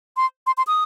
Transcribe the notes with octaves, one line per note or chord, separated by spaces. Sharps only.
C6
C6
C6
D#6